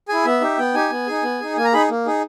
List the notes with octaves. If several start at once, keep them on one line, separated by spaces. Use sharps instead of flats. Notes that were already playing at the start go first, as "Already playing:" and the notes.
E4 G#4 G#5
B3 E5
D#4 G4
B3 G5
D#4 G4 G#5
B3
D#4 G#4
B3
D#4 G#4
A#3 G#5
A#5
D#4 G#4 B5
A#3
D#4 G#4